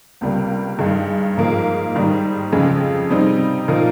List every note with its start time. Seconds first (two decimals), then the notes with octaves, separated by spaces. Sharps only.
0.21 C#2 C3 G3 A#3
0.78 G2 D#3 G#3
1.37 G#2 F3 A#3
1.95 G#2 D#3 G3
2.52 F2 C#3 G#3
3.10 C3 G3 C4 D#4
3.68 A#2 F3 A#3 D#4